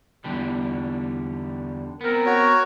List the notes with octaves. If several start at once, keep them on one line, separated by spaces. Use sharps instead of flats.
E2 D3 G3
B3 C4 A#4
F#4 C#5